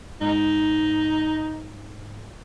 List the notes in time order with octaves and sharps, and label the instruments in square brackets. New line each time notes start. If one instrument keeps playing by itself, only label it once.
[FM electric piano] G#2 [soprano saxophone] D#4